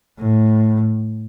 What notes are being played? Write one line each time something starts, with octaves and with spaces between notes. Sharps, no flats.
A2